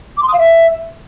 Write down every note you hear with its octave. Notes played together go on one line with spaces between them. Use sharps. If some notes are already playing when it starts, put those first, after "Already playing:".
D6
C6
D#6
F5
E5